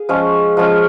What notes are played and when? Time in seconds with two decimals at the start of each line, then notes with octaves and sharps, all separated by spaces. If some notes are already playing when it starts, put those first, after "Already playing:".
Already playing: G#4 F5
0.09 F3 G#3 C#4 F4
0.57 F3 G#3 C#4 F4